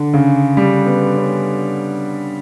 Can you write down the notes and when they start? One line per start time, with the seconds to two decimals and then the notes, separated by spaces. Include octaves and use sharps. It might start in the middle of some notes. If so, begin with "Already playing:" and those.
Already playing: D3
0.14 C#3
0.57 G3
0.86 B3
1.15 C#4